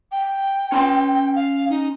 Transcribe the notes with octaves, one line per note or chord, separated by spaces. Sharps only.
G5
C#4 B5 C6
F5
D#4